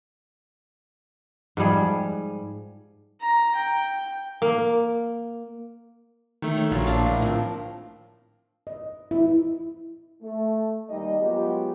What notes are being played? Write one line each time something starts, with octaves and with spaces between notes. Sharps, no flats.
G#2 F3 G3 G#4
A#5
G5
A#3
D#3 A3
C#5
A#1 F#3 F4 E5
A#3 D4 F5
A2
F3 C4
D#5
E4
A3
D#2 G3 D#4 D#5
F#3 G#3 B3 F4 G4